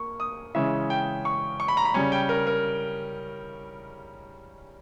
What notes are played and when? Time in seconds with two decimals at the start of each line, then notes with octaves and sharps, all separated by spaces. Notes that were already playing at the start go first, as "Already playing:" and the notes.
Already playing: A#3 C#6
0.20 D#6
0.55 C#3 E3 G#3 C#4 E5
0.90 G5
1.25 C#6
1.60 C#6
1.68 B5
1.77 A#5
1.85 B5
1.94 C#3 G3 C#4
2.12 G5
2.29 A#4
2.47 A#4